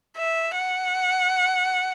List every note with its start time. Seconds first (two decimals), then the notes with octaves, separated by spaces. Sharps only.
0.17 E5
0.55 F#5